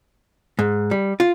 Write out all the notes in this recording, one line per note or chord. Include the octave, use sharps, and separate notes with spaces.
G#2
G3
F4